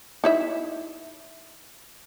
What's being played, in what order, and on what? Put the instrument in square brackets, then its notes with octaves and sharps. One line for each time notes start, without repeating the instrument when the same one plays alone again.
[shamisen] D#4 E4 E5